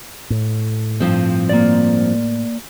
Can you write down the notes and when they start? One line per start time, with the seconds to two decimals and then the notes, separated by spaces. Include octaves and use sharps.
0.30 A2
1.00 G2 F3 C4
1.49 A#3 D5